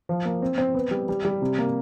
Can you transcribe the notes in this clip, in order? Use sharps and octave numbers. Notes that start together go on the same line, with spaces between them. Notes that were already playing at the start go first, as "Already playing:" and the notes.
F3
A#3
C4
C4
B3
G3
G3
G3
C3
A#3